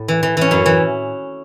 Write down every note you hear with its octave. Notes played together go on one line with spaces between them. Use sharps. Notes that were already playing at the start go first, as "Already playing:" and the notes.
Already playing: A2
E3
E3
E3 C#4
F#2 E4
E3